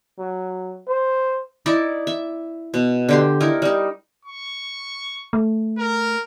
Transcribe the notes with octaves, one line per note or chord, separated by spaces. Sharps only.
F#3
C5
D#4 E4 D5 E5
E5
B2
D3 G4 C6
D#4 E4 A#4
G3 D#4
C#6
A3
A#4